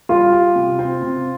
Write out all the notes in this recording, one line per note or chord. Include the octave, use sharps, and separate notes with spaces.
G3 F4
G4
C3
C4
C3